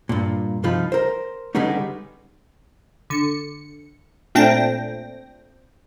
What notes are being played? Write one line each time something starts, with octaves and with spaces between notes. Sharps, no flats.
G2 A#2
C2 F3 D#4 F4 B5
A#4 C5
D3 G3 G#3 B3 C#4 D#4
D3 C#7
A#2 A3 C4 D4 G5 A#6